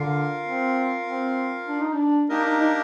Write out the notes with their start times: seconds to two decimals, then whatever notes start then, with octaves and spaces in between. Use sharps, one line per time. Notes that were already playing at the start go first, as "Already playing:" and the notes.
Already playing: D3 F4 A#4 F5
0.44 C4
1.06 C4
1.67 D4
1.81 D#4
1.94 D4
2.29 A#3 D4 D#4 G4 A#4 D#5
2.45 D#4
2.60 D#4